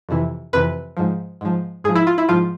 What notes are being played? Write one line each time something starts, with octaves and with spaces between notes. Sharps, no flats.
F2 C3 E3
F2 C3 E3 B4
G#2 F3
G#2 F3
G#2 F3 G#4
E4
F4
E4
G#2 F3 F4